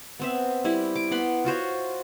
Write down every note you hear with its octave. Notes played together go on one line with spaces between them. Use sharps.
B3 C4 E5
G3 E4
D6
B3 F#5 B5 C6
F4 F#4 C5 C#5